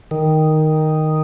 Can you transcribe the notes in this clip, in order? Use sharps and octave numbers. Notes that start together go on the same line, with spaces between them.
D#3